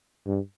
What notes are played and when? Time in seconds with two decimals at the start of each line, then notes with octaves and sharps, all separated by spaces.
0.27 G2